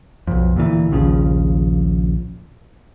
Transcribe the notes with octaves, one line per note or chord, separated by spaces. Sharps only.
B1 F2
D2 A#2 E3
A#1 D#2 C#3 F3